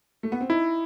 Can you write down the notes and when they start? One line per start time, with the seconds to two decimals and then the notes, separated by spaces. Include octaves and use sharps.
0.23 A3
0.32 B3
0.41 C4
0.50 D#4 E4